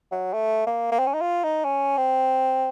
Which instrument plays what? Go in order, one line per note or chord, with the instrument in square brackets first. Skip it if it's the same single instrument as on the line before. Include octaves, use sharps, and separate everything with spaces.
[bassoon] F#3
A3
A#3
A#3
C4
C#4
D#4
F4
D#4
C#4
C4